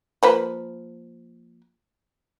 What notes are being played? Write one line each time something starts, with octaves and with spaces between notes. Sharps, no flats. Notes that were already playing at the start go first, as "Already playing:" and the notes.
F3 A#3 B4